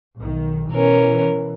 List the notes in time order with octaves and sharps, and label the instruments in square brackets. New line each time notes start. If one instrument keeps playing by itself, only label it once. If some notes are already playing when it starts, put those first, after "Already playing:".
[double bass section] B1 D#3
[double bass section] B2 E3 [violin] C#4 A#4